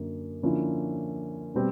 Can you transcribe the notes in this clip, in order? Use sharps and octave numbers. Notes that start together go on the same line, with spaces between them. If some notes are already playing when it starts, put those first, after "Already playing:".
Already playing: F#2 D3 A#3
D3 F3 A#3 C#4 E4
B2 G3 C4